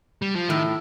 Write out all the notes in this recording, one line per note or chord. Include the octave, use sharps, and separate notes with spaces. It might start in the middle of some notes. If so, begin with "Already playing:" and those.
G3
F3
A2 D#3